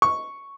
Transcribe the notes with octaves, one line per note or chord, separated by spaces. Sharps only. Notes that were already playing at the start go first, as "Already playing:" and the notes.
C#6